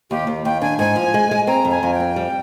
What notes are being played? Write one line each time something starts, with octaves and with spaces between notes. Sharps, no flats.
D#2 G4
D#2
D#2 G5
D4 G#5
G#2 G#5
F3
G#3
G#3
C4 A#5
F2
G#5
F2
G5
C4
G3